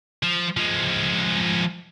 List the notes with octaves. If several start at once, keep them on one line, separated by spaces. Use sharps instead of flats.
F3
F3 G#3